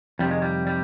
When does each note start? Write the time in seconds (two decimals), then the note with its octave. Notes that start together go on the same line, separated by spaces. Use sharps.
0.19 F2 C3 D#3 G3
0.31 G#3
0.42 G3
0.67 G3